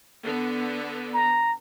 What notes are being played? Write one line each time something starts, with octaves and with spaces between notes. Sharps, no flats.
D3 B3
A#5